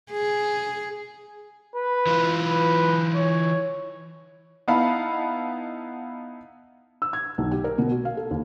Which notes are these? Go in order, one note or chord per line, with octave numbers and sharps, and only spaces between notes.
G#4
B4
E3 F4
B4
C#5
B3 D#4 E4 F5 A5 B5
E6
G#6
B1
G4
A#4
B2
F#4
F5
A4
D#2